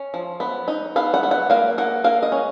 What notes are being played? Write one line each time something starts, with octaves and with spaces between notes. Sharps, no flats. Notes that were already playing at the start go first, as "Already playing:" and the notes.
Already playing: C#4
F3
B3
D#4
B3 F5
F#5
B3
F#5
A#3 F5
A#3 F#5
A#3 F5
D#5
C#4